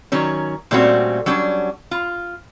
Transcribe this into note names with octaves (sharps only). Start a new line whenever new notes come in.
D#3 F#3 C#4
A#2 G3 A3 C4 C#4 F#4
F#3 G3 C#4 D4
F4